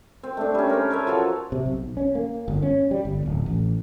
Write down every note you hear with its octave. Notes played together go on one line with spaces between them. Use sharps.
C4
A3 D4
G3 C#4
A#4 C5
A4 B4 C#5 E5
F3 F#3 A4
C3
B1
C#4
A#3
G1
C#4
G3
G1
D1
A1